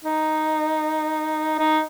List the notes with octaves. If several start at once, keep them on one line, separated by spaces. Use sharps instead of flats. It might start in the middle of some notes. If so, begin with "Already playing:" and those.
D#4
D#4